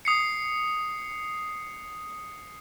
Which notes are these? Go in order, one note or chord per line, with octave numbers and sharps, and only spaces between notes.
D#6 C7 C#7